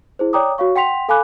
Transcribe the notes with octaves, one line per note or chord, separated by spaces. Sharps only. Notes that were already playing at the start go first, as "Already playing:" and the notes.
E4 G#4 C5
C#5 D5 G5 A#5 D6 D#6
F#4 C#5 F5 C#6
F#5 G5 C6 B6 F7
A4 F5 G#5 B5 D6 F#6